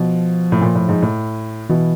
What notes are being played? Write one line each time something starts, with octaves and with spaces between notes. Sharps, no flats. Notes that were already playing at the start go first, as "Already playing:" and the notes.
Already playing: B2 F3
A2
A#2
A2
G#2
A2
B2 E3